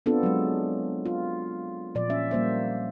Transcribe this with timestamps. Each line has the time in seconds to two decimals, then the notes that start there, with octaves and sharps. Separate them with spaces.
0.06 B3 C4 D4 F4 A4
0.23 F#3 G#3
1.06 F4
1.95 A#2 F3 D5
2.10 C#4 E5
2.31 G3 A#3 C5 E5